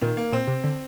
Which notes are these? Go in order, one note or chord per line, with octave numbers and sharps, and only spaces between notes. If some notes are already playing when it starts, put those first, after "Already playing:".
A#2 D#3
A#3
A#2 C4
C3
D3